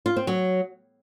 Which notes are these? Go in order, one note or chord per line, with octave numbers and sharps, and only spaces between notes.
F4
C4
F#3